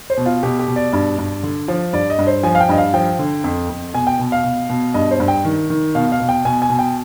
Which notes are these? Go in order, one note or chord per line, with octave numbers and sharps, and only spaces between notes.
C5
B2
F4
B2 G4
G4
B2
D5
G2
G2
D3
F3
G2 D5
D#5
G2
C5
F3 G#5
F5
G5
G2 D#5
F5
F3 G5
D3
F2
F2
B2 G#5
G5
B2
F5
B2
B2
G2 D#5
C5
G2
G5
D#3
D#3
B2 F5
F5
B2
G5
B2 G#5
G#5
B2
G5